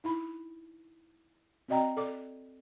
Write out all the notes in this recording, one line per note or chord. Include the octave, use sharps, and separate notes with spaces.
D#4 E4 B5
C4 F#4 D5 D#5 G5 A#5
A4 D5 D6